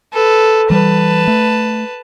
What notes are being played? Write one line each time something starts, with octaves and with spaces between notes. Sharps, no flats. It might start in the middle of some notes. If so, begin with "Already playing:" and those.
A4 B4
E3 G3 B4 A5
A3